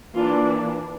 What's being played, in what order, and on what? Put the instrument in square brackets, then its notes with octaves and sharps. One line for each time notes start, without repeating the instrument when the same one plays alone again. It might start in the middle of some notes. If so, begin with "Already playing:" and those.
[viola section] E3 A#3 D4 F4